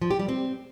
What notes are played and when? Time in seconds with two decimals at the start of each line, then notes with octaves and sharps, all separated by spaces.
0.01 F3
0.10 G4
0.19 G3
0.28 C4